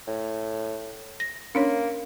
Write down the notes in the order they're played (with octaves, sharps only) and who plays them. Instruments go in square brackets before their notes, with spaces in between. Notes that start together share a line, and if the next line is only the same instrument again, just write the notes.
[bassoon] A2
[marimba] A#6
[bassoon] A#3 [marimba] C#4 D4 C#5